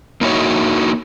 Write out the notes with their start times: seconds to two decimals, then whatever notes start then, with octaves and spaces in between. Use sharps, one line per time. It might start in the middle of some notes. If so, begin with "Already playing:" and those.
0.21 A#3 D#4 E4 F#4 C#5